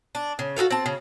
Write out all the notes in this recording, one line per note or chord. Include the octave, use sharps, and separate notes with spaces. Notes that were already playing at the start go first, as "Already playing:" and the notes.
D4
C#3
F#4 G#4 A4 F5
C4 A5
C#3